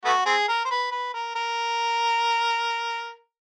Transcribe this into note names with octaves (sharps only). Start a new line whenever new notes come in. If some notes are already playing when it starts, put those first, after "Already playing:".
A3 B3 F#4
C4 G#4
A#4
C5
B4
B4
A#4
A#4